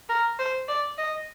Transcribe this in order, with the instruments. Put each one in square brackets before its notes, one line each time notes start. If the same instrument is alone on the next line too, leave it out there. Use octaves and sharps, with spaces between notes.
[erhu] A#4
C5
D5
D#5